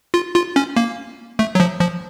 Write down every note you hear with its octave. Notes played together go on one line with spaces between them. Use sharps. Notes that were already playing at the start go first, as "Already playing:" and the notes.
F4
F4
C#4
A#3
A3
F#3
F3
F3